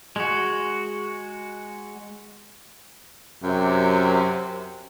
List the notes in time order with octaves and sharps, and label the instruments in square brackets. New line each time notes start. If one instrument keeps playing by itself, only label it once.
[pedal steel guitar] G#3 F#4
[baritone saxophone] F#2 [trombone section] C3